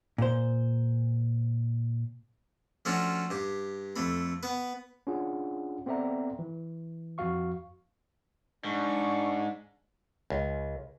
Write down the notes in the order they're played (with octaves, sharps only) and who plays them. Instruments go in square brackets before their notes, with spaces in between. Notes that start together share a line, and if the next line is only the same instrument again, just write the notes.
[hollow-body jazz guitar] A#2 C5
[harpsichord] F3 A3 C#4 D4 F4 F#4
G2 G4
F2 A3 B5
B3 B4
[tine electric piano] C#4 D4 F4 G#4 F#5
B3 C4 A4 D5 E5 A#5
E3
F2 F3 F#4 F5 C#6
[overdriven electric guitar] G#2 [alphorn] D4 [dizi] C#6
[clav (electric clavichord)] C#2